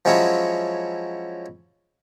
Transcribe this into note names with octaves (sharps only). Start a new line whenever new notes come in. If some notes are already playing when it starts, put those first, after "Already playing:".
F3 F#3 G#3 C#4 E4